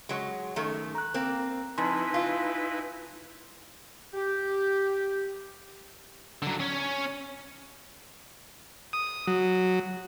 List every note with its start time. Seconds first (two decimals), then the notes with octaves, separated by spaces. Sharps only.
0.09 F#3 G#3
0.56 F#2 D#3 A3
0.95 A#5 F#6
1.14 A#3 C4
1.78 F2 D#4 E4 B4 G#5 C6
2.14 F4
4.14 G4
6.42 D3 F#3
6.60 C#4 C#5
8.93 D#6
9.27 F#3